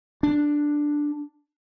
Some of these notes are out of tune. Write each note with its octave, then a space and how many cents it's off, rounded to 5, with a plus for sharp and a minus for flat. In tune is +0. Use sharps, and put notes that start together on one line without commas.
D4 +0